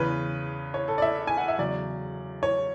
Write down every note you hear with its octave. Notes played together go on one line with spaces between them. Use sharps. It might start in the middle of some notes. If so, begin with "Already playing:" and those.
Already playing: E2 C#3 E3 B4
C#5
A4
D5
E5
G#5
F#5
E5
E2 C#3 F#3 D5
C#5